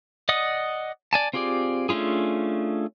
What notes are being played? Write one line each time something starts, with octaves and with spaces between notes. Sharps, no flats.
D5 D#5 F#5 D#6
D5 G#5 A5
C4 F4 G4 G#4 D5
A3 C#4 D4 F4 G#4